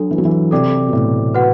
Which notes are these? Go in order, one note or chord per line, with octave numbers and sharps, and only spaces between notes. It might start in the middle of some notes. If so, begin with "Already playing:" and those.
Already playing: F#3 D4 F#4 A4
E3
F#3
E3
C3 A4 D5 G5 D6
B2
A2
F#4 B4 F#5